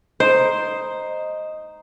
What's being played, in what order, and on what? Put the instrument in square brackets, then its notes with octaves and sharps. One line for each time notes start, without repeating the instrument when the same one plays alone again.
[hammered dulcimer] D#4 [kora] C5